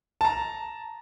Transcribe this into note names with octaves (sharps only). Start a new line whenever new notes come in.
A5 A#5